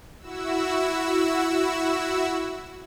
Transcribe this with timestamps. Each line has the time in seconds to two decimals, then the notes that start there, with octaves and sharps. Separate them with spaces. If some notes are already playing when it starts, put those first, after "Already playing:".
0.19 E4 F#4 E6